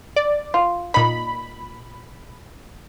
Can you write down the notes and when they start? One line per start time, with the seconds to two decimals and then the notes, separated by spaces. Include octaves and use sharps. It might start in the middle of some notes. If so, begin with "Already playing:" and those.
0.16 D5
0.54 F4
0.94 A#2 D#4 B5